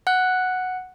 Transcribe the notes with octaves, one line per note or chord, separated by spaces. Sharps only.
F#5 F#6